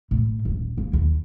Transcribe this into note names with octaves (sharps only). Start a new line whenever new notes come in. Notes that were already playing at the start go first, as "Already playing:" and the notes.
A2 A#3
D#1 G#1
A#3
D#2